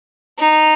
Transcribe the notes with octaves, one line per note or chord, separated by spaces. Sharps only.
D#4